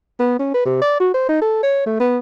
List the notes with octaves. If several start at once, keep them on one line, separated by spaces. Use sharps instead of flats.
B3
C#4
B4
C3
D5
F#4
C5
D#4
A4
C#5
A3
B3